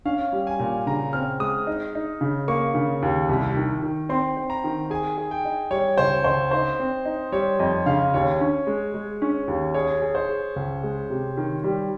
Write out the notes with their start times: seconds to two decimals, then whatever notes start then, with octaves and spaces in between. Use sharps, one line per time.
0.05 C#4 F5
0.33 G3
0.47 G#5
0.59 A#2
0.86 C#3 A#5
1.13 C4 F6
1.40 G#3 D#6
1.67 D#4
1.95 D#4
2.21 C#3
2.48 A#3 C#6
2.75 C#3
3.02 D#2
3.29 C2
3.56 D#3
3.83 D#3
4.09 C4 C6
4.37 C4
4.50 A#5
4.64 D#3
4.90 G#4 G#5
5.17 G#4
5.31 G5
5.45 D#4
5.71 G3 C#5
5.98 C#2 C5
6.24 C#2 C5
6.51 D#4 C5
6.79 C4
7.05 D#4
7.32 G3 C#5
7.59 F2 D#5
7.86 C#3 F5
8.14 D#2 C#5
8.41 C#4
8.67 G#3
8.94 G#3
9.22 C#4
9.48 D#2
9.74 G#4 C#5
10.02 G#4
10.15 C5
10.29 G#4
10.56 C#2
10.83 G#3
11.10 C3
11.37 D#3
11.64 G3